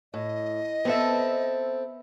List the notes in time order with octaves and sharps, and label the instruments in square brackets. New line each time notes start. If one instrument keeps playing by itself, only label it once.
[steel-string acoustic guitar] A2 [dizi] D#5
[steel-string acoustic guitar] B3 E5 [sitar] C4 A4